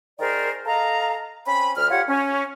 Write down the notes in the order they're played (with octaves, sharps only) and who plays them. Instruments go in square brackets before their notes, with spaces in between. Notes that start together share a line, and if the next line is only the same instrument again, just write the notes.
[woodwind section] D#3 G#4 A#4 C5 D5
A4 D#5 F5 A#5
C4 C#4 B5
D2 F6
F4 G4 C#5 F#5
C#4